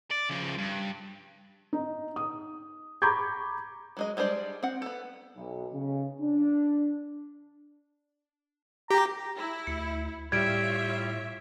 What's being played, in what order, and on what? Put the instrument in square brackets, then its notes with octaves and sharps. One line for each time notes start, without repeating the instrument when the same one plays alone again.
[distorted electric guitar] D5
C#3 F3
G2
[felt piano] D#4
D#6
A#5 B5 C#6 D6 G6 G#6
[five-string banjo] F#3 G#3 D#5
G3 G#3 D4 C5 D5
C4 F#5
B3 A4
[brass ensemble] B1
C#3
D4
[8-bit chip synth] G4 [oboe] A#5
[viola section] E4
[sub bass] D2 [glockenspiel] C#7
[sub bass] A2 [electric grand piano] G3 G4 [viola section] F4 C#5 E5 [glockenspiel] G#6 D7